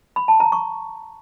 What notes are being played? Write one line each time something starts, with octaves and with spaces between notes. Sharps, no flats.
B5
A5
A#5
C#6